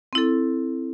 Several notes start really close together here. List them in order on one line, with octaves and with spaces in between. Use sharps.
C4 E4 A4